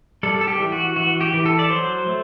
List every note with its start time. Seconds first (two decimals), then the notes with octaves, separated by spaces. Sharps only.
0.23 G3 A4
0.41 A4
0.48 G4
0.60 E3
0.72 F#4
0.96 E3 F#4
1.21 G4
1.34 E3
1.46 A4
1.59 D5
1.70 F#3 C5
2.06 A3